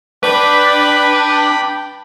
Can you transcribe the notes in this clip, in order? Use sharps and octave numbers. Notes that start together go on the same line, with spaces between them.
D4 B4 G5 B5